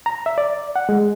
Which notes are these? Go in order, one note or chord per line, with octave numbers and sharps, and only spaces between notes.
A#5
E5
D5
F#5
G#3